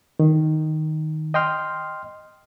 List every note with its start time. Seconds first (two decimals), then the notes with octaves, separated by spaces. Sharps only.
0.20 D#3
1.34 D#5 G5 C6 F6